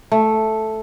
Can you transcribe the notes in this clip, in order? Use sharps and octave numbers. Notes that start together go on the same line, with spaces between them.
A3